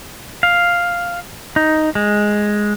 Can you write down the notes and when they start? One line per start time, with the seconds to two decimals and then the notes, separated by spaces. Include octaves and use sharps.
0.43 F5
1.56 D#4
1.95 G#3